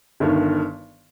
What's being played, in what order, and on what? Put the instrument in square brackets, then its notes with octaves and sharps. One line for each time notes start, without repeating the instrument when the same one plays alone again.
[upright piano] G1 G2 D#3